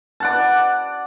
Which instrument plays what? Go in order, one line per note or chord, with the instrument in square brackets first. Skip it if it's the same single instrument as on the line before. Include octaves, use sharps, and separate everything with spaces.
[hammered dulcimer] D5 F#5 A5